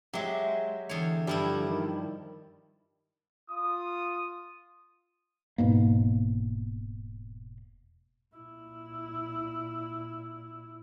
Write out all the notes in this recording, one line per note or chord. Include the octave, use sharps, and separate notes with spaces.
F#3 G#3 G4 E5
E2 D3 C#5
G2 F3 G3 E4
D#3
F4 D#6
E1 G#2 B2 A#3
A#2 E4